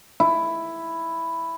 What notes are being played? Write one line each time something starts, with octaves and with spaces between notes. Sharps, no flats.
E4